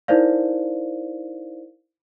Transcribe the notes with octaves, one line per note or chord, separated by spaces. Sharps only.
D#4 E4 A#4 C5 D5 F5